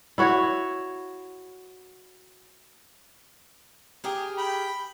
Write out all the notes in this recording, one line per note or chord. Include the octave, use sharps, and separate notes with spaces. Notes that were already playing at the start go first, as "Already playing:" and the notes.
E4 F#4 C#5
G4 G#4 A#4
G5 B5